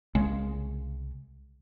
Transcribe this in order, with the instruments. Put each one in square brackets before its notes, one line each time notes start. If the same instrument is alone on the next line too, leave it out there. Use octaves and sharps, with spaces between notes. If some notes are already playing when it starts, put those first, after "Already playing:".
[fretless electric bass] C2 C#3 G#3